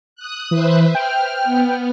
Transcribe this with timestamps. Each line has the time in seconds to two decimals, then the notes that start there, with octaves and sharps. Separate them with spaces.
0.16 D#6 F#6
0.51 E3 B4 C5 E5
0.95 G5 F6
1.44 B3